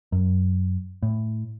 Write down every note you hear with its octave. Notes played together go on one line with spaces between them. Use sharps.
F#2
A2